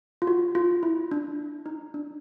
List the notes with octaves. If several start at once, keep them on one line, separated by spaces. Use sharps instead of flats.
F4
F#4
F4
E4
D4
D#4
D4